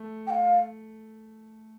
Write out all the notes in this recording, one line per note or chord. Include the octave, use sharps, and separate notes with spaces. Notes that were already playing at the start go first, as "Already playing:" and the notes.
Already playing: A3
G5
F5